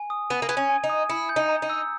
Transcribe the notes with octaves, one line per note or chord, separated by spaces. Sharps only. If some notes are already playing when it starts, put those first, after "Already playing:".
Already playing: G#5
D#6
B3 D#7
A#3
B3 G#6
C#4
G#5
D#4
D#6
E4 C#7
G6
D#4
A#5
D#4
E6